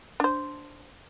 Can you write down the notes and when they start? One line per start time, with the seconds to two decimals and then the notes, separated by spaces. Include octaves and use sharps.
0.20 D4 C5